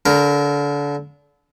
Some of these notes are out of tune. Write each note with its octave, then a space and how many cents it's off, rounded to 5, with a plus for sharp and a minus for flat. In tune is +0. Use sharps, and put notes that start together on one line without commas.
D3 -30 A#4 +0